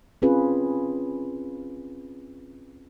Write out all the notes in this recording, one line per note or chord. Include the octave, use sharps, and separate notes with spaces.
C4 C#4 F4 G#4 B4